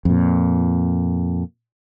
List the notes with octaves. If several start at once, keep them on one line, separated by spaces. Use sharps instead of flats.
F2 A#2